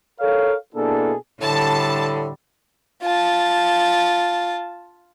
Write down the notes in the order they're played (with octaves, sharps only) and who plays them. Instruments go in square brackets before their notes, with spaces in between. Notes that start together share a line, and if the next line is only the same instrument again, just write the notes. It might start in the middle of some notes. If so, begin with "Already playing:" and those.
[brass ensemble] A4 A#4 C#5 F5
B2 A#3 D4 E4 G#4 A4
[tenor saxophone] A2 [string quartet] D3 G3 [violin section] A5
[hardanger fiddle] F4 A5